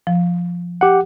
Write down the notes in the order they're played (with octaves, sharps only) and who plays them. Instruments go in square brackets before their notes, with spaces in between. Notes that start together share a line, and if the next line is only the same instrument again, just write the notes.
[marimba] F3
[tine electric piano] G4 F#5